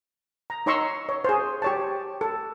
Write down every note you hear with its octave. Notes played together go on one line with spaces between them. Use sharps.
A#5
D#4 C#5 A#5 C6 C#6 E6
C#5
G#4 C5
G4 C#5 A5
A4